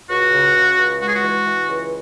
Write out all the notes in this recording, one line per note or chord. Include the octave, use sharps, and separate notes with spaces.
C#2 F#4
C#3
C#3
C#2
G#3 F#4
G#4
F#4
E3
E3
C#2